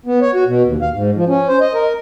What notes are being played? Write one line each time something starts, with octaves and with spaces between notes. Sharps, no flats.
B3
C#5
F#4
B2
D#2
F5
G#2
F3
C#4
C5
D#5
A#4